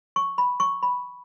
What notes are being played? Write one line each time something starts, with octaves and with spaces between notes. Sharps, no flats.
C#6
B5
C#6
B5